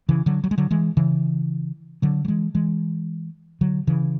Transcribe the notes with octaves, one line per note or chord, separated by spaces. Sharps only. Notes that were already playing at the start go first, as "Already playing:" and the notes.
C#3 E3
D3 F#3
F#3
G#3
D3 F#3
E3 G#3
C#3 E3
D3 F#3
F#3
E3 G#3
E3 G#3
D3 F#3
C#3 E3